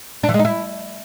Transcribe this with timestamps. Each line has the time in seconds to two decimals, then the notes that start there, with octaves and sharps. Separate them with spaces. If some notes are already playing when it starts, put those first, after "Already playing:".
0.23 D4
0.29 E3
0.34 G#3
0.39 D#4
0.45 E4